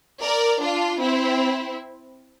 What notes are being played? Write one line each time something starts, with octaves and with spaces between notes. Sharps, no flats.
A#4 D5
D4 F4
C4 E4